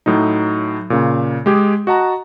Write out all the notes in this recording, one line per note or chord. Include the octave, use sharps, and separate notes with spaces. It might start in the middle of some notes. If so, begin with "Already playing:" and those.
A2 F#3 D#4
A#2 C#3
G#3 G4 G#4
F#4 D#5 F#5 A5 A#5